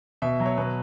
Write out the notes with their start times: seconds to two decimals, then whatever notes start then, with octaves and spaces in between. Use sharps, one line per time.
0.22 B2 E5
0.40 F#3
0.46 C#5
0.57 B2 B4